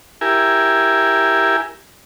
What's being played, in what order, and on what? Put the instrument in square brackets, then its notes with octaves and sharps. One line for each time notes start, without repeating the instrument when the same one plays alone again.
[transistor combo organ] E4 G4 A#4 G#5